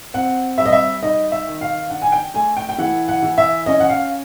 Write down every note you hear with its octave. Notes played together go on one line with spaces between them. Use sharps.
C4 F#5
G3 E5
D#5
E5
D#4 D#5
E5
D#3
F5
D4 F#5
G#5
G5
A3 G#5
G5
G5
E3 F#5
F#5
E3
E5
C#4 D#5
F#5
F5